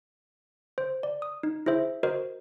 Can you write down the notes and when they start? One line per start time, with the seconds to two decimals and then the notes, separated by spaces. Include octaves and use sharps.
0.78 C5
1.03 D5
1.22 D#6
1.43 D#4
1.66 E4 G#4 C5 E5
2.03 F#4 A#4 C5 D#5